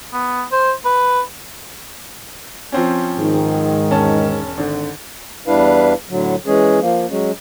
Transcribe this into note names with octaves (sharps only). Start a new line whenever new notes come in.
B3
C5
B4
F3 C4 C#4
G#2 D#3
E1 C#4 A5
G#1 D3
E2 G3 D4 E4 B4 F5
A2 D3 F#3
E3 G#3 C#4 G#4
F3 A#3
F#3 G#3 C#4